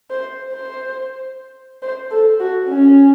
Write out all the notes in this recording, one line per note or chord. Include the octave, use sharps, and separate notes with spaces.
C5
C5
C5
A4
F#4
C#4